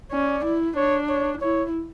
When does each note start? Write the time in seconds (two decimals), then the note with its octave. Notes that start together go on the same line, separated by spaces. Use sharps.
0.12 C#4 D5
0.44 E4
0.77 D4 C#5
1.09 C#5
1.41 E4 C#5